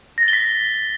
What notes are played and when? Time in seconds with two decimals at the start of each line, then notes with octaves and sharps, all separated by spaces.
0.18 A#6
0.23 A6
0.28 G7
0.33 B6